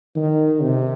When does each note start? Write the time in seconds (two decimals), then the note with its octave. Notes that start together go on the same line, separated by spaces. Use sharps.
0.16 D#3
0.62 C3